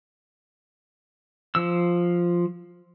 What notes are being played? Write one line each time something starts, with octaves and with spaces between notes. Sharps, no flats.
F3 E6